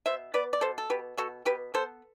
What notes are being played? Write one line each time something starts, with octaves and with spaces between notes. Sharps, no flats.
B2 C5 E5
B3 B4 D5
D5
B2 A4 C5
A4
B2 G4 B4
B2 F#4 A4
B2 G4 B4
B3 A4 C5